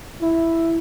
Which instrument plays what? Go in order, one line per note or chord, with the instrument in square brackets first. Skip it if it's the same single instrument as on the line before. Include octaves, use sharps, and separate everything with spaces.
[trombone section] E4